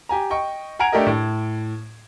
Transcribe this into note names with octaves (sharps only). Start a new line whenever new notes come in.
G4 G#5 A#5
D#5 G5 C#6
F#5 G#5 A#5 G#6 D7 F7
A3 D4 G4 A#4 D#5
A2